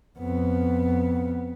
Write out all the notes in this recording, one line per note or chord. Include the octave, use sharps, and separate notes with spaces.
F2 B3